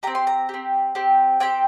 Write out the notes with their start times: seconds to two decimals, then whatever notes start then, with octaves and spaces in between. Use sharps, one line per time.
0.03 C4 G4 A#5
0.15 C6
0.27 A#5
0.49 C4 G4
0.95 C4 G4
1.40 C4 G4 G5